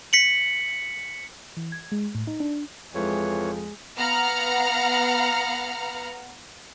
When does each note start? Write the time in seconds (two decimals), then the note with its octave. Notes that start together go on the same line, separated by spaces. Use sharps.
0.13 B6 C#7 F#7
1.57 E3
1.72 G#6
1.92 G#3
2.15 A2
2.27 D#4
2.40 D4
2.95 F2 E3 G#3 C#5
3.97 B3 F5 F#5 A#5 F6